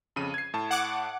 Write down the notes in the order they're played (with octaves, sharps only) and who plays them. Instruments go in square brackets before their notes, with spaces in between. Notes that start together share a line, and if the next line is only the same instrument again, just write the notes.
[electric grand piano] F2 C#3 D#7
G#6 C7
A2 A5
[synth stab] F#5 D6